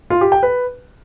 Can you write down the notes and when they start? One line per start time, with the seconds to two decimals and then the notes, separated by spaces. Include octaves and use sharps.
0.10 F4
0.21 G4
0.32 G5
0.43 B4